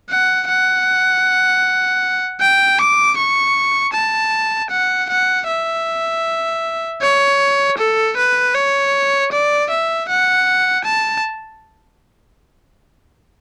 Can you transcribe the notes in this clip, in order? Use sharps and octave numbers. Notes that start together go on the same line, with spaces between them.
F#5
F#5
G5
D6
C#6
A5
F#5
F#5
E5
C#5
A4
B4
C#5
D5
E5
F#5
A5